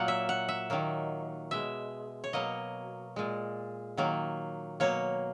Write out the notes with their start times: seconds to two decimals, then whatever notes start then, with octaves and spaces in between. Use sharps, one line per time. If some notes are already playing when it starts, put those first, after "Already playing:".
Already playing: A#2 F#3 A#3 F#5
0.08 E5
0.29 F#5
0.48 E5
0.70 D#3 F#3 A#3
1.51 B2 G#3 E5
2.24 C#5
2.33 B2 F#3 A#3 D#5
3.16 A#2 G#3
3.97 D#3 F#3 A#3
4.80 B2 F#3 A#3 C#5